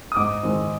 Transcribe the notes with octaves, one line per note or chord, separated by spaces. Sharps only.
D#6
G#2 D6
D#3 G#3 C4